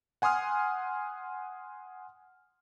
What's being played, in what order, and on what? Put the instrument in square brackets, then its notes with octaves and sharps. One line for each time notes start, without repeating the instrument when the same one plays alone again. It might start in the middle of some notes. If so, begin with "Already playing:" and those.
[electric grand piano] F#5 G#5 C6 D#6 F6